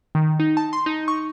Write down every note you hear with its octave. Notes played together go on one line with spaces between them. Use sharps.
D#3
D#4
A5
C6
D#4
C#6